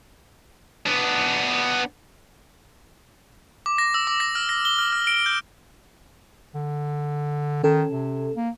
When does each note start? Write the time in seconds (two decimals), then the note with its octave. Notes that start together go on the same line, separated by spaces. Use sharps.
0.86 B3 D4
3.66 D6
3.78 A#6
3.94 E6
4.07 D6
4.20 A#6
4.35 F6
4.49 A#6
4.65 G7
4.79 F6
4.92 F6
5.07 D7
5.26 G6
6.55 D3
7.64 D#3 C#4 A4
7.91 C3
8.36 A#3